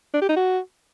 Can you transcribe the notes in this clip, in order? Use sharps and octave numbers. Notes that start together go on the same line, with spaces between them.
D4
G4
D#4
F#4